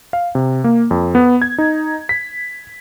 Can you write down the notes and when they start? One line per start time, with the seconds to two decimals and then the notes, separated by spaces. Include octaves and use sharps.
0.13 F5
0.35 C3
0.64 A#3
0.91 F2
1.15 B3
1.42 G#6
1.58 D#4
2.09 B6